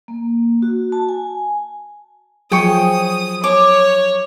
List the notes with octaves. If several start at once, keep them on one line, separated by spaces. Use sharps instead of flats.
A#3
F#4
A5
G#5
F3 F#3 G#4 G5 C#6 D#6
C#5 D6